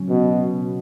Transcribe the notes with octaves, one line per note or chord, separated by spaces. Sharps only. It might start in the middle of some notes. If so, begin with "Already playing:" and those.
Already playing: C#3 F#3 C#4
B2